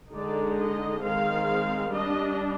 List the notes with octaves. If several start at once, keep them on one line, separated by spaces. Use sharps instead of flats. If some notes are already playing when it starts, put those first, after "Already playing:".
D3 G#3 D#4 D5
D#5
D#3 G#3 C4 F5
G3 D4 D#5